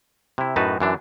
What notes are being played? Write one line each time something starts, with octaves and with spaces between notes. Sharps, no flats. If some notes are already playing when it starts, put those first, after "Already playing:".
C3 E4
F#2 A2 D#4 F#4 B4 A5
F#2 E3 D4